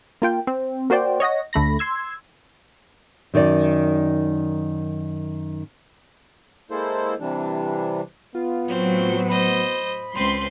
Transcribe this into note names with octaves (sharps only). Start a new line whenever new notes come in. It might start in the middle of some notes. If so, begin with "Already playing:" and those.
A#3 F4 G5
C4
A#3 F#4 C5 D5 G5
C#5 D#5 F#5 A#6
D2 A3 B5 A#6
C6 E6 G#6
F#2 D#3 D#4 D5
G#3 A#3 E4 A4 C5
C3 E3 G3 D4
B3 F4
A2 F#3 C4
C5 D#5 B5
C#2 C4 B4 C6